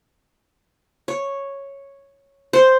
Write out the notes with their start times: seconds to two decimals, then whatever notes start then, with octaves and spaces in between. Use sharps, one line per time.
1.08 C#5
2.53 C5